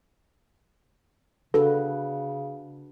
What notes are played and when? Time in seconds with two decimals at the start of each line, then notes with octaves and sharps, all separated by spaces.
1.54 C#3 D4 F#4 A4 B4